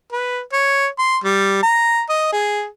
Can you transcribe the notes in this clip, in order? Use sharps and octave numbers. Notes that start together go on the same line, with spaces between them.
B4
C#5
C6
G3
A#5
D#5
G#4